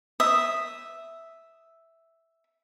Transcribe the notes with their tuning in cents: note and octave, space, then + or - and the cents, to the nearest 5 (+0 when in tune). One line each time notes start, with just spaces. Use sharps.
E5 +0 D#6 +0